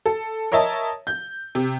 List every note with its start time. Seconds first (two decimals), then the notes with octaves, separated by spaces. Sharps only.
0.06 A4
0.52 A#4 C#5 D#5 E5 A5
1.07 G6
1.55 C3